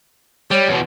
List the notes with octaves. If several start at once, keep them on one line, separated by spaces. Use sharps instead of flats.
G3 C#5
E2 B2